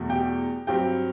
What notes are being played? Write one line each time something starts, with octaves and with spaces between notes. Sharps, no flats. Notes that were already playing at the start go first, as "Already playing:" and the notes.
Already playing: E2 B2 F#3 A3
G4 G5
G2 F#3 C4 G4 G5